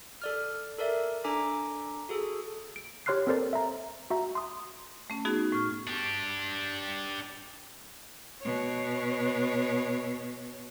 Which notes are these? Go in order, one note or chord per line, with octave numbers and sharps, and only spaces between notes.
A4 D5 F6
A4 A#4 D5 E5
D4 A4 G#5 A#5 D6 B6
F#4 G#4 A4
D7
G4 C#5 C6 F6 F#6 C7
C4 A4 A#4 C5 D5
E5 A#5
F#4 E5 A#5
C6 D#6
A3 C#4
B3 D#4 F#4 G#4
A2 C#6 F6
D4 G4
B2 C#5